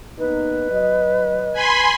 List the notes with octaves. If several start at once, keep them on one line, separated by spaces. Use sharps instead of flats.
A#3 B3 D#4 B4
F#3 D#5
G#5 B5 C6